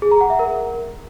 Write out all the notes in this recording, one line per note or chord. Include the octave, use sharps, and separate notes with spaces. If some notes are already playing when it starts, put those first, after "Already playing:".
G#4
A#5
F#5
E5
A#4